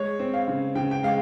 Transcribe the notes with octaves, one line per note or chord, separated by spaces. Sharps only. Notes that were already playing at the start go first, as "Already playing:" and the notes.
Already playing: G#3 C#5
C4
F5
C#3
C#3 G5
G5
G#3 F5